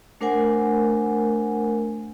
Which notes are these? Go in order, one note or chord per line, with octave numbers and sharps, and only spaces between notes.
A3 D4 A#4 C5 F#5 G#5